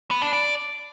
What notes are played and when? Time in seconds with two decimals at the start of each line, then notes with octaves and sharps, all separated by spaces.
0.11 B3
0.22 D4
0.33 D5